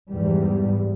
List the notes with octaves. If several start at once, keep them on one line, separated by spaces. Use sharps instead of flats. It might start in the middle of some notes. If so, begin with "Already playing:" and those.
E2 G#2 G3